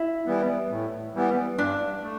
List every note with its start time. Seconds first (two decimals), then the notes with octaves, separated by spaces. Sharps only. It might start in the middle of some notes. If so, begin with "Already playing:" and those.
Already playing: E4
0.26 E3 G3 B3
0.70 A2
1.14 E3 G3 B3
1.58 G2 D4
2.02 A3